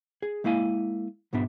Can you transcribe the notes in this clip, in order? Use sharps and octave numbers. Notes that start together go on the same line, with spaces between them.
G#4
G#3 A#3 E4 F5 G#5
B1 G#2 B3 D4 E5